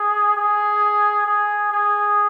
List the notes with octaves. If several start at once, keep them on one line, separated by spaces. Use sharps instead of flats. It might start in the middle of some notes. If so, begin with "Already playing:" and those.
Already playing: G#4
G#4
G#4
G#4